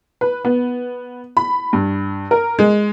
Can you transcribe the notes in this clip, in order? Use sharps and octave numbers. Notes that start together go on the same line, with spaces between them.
B4
B3
B5
G2
A#4
G#3